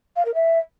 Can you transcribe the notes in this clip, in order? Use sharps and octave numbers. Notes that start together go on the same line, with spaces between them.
F5
A#4
E5